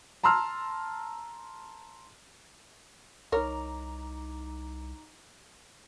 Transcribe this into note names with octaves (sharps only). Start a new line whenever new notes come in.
A5 A#5 C6 E6 F6
C2 D#4 A#4 C#5 A#5 D6